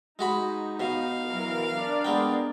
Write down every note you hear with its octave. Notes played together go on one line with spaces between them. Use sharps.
G#3 D#4 F#4 B5
B2 F5
E3 F#3 A#4
D4 A#4 D5
G#3 B3 G5